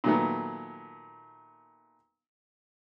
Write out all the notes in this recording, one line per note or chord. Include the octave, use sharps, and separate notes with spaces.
A#2 D#3 F#3 A3 B3